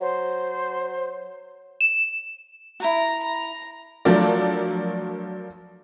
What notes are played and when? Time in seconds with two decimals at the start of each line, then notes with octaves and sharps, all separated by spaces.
0.01 F#3 C5
1.81 E7
2.80 E4 F#4 A#5
3.23 A#5
4.05 F3 F#3 A3 D4 A#4 D5